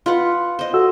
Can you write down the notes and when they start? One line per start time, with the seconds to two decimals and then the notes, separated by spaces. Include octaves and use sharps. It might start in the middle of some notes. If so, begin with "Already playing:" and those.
0.06 F4 B4 F#5
0.59 C5 D#5
0.74 F#4 A4 E6